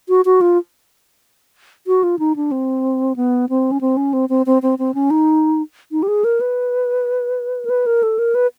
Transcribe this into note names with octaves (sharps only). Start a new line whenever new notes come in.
F#4
F#4
F4
F#4
F4
D#4
D4
C4
B3
C4
C#4
C4
C#4
C4
C4
C4
C4
C4
C#4
D#4
D#4
G4
G#4
A#4
B4
A#4
B4
A#4
A4
A#4
B4